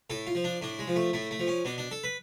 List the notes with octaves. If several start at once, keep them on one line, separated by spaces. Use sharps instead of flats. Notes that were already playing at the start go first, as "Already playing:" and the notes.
A2 A4
F4
F3
D4
A2 D4
G#3
F3
A3
A2 A3
A3
F3
C#4
B2 D4
D4
A4
B4